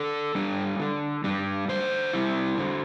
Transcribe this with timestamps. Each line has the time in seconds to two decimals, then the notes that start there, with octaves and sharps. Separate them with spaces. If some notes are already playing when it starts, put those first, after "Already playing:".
Already playing: D3 A4
0.35 G3 D4
0.79 D3
1.24 G3 D4
1.68 D3 C5
2.13 G3 C4 E4
2.58 D3